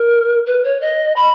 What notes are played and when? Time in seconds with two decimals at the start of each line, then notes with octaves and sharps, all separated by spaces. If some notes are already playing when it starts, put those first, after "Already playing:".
Already playing: A#4
0.46 B4
0.64 C#5
0.81 D#5
1.16 B5